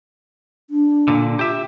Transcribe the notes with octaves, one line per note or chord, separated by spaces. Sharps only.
D4
A#2 D3
F4 G4 E5